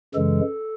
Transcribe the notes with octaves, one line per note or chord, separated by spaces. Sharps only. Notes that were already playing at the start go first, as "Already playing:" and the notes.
F#2 C#3 E3 G#3 A4